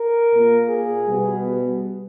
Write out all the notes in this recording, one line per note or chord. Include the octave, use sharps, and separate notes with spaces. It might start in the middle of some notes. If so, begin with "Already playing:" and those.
Already playing: A#4
A#2 A#3
G#4
B2 G3 B3